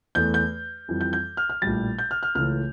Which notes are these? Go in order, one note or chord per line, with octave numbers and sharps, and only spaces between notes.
E2 E3 A3 G6
G6
F2 E3 G3
G6
G6
F6
F6
A#1 A2 G3 A6
G6
F6
F6
C#2 C#3 E3 A3 F6